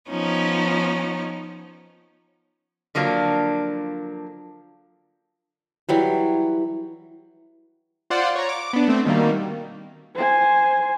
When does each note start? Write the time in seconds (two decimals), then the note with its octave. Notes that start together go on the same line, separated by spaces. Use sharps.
0.10 F3 B3 C#4 D#4
2.95 D3 F3 F#3 A#3 D4
5.89 E3 F#3 G3
8.10 F4 C5 D5 F#5
8.35 C#5 A#5
8.49 D6
8.73 B3 D4
8.88 A3 C4
9.05 B2 D#3 G3 A#3
10.15 C5 G#5